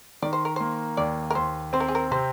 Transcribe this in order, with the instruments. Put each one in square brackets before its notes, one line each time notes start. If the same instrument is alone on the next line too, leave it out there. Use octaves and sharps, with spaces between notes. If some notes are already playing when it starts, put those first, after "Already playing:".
[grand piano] D#3 [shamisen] D5
[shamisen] C5
A#4
[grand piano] A#3 [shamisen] C5
[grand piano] D#2 [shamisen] D5
[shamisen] A#4
[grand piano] D#2 [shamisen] C5
[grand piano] C4 [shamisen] C5
[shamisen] A#4
G#4
A#4
[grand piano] C3 [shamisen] C5